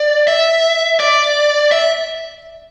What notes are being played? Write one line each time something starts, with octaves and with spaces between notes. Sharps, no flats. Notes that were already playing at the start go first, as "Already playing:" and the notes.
Already playing: D5
E5
D5
E5